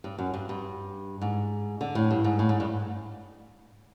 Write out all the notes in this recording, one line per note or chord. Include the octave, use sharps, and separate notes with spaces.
G2
F#2
G2
G2
G#2
D3
A2
G2
G#2
A2
G#2
G2